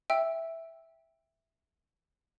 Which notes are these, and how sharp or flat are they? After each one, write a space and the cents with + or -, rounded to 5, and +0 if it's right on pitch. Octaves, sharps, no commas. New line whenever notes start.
E5 +0 G5 +10 E6 +0